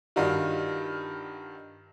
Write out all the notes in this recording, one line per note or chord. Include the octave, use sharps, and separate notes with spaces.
G2 D#3 D4 D#4 F4 F#4